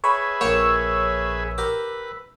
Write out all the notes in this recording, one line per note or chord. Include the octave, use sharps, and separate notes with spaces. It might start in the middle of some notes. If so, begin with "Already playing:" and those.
G#4 B4 C#5 E5 B5
A#1 A#3 C#5 G5 E6
G4 A#4 B4